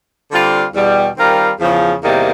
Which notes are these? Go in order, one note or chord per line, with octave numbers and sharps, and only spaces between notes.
D3 G3 C4 F4
E2 B2 G3
D#3 G3 C4 F4 A#4
E2 C#3 F3
E2 C3 D#3 G3 A#3